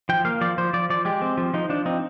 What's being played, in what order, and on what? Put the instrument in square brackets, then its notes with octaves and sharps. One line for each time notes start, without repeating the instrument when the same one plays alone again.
[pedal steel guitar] F3 G5
A#3 F5
F3 D5
F3 C5
F3 D5
F3 D5
G#3 G4
C4
F3
F3 D#4
F3 D4
C4 D#4